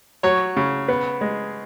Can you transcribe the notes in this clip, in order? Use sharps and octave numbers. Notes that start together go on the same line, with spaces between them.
F#3 C#5
C#3
B3
G#3